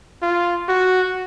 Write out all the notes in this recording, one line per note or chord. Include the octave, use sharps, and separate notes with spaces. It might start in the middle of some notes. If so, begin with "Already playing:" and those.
F4
F#4